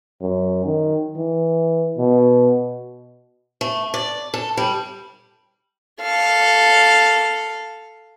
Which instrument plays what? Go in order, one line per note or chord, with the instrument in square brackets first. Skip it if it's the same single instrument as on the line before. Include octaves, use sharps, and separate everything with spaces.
[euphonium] F#2
D#3
E3
B2
[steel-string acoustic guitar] A3
D5
A4
G3
[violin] A4 F5